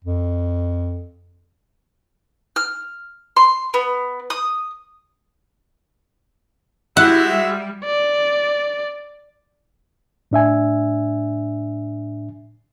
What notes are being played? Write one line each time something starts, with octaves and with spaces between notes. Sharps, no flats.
F2
F6
C6
B3
D#6
G#3 E4 F#4 G4 E5 F#5
G3
D5
A2 D4 E5 G#5